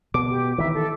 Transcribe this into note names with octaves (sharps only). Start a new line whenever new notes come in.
B2 D6
G4
D#3 E3 E5
A4